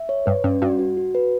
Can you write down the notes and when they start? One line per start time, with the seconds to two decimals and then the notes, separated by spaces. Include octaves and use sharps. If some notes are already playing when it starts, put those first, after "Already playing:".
Already playing: E5
0.09 C#5
0.26 G2 B4
0.44 G2 C#4
0.62 G2 F#4
0.79 F#4
0.97 F#4
1.15 B4